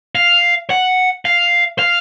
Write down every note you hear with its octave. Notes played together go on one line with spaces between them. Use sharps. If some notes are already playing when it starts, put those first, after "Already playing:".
F5
F#5
F5
F5